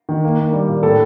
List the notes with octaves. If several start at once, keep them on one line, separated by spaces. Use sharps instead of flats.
D#3
A#3
A#3
G3
A#2
A2 A4